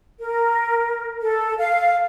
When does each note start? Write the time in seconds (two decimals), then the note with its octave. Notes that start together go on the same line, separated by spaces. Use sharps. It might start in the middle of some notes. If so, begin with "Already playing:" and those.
0.20 A#4
1.21 A4
1.58 F5